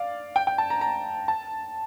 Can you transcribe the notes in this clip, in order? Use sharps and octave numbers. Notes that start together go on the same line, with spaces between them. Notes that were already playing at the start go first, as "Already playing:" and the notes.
Already playing: D5 F5
G5
G5
A5
A#5
A#5
A5